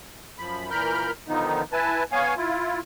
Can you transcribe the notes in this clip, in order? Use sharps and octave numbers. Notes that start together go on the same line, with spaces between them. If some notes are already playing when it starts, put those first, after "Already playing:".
F#2 F3 B5
A#2 E3 A#4 B5 F6 G6
D3 D#3 F3 B3 D#4
E4 B4 G#5 A5
B3 C#5 F5 G#5
E4 F4